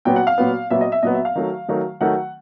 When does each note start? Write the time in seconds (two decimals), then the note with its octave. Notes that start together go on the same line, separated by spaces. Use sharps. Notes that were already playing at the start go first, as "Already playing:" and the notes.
0.05 A#2 F#3 B3 G5
0.16 F#5
0.27 F5
0.38 A#2 F#3 B3
0.70 A#2 F#3 B3 E5
0.81 D#5
0.92 E5
1.03 A#2 F#3 B3 D#5
1.14 E5
1.25 F5
1.35 D#3 F#3 A3
1.68 D#3 F#3 A3
2.01 D#3 F#3 A3 F#5